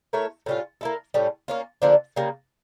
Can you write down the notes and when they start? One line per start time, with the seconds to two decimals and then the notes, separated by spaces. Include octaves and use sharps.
0.13 A3 E4 A#4 C#5
0.46 A2 G3 C#4 F4
0.81 A#3 E4 A4
1.14 A2 G3 C#4
1.48 A#3 C#4 F4
1.82 D3 F3 A#3 D4
2.16 C#3 G3 A#3